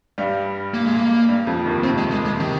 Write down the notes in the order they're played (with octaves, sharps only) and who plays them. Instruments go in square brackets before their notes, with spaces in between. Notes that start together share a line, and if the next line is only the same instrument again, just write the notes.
[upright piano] G2 G3
[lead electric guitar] A#3
G#3
A#3
[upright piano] G2 G3
F2 F3
D#2 D#3
[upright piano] C3 [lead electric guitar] C4
[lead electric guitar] G#3
G#3
G#3
[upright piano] C3 [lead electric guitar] D#3